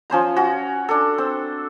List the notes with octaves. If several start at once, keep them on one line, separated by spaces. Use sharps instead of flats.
F3 C#4 C5 A#5
C#4 F#4
D4 A4
C4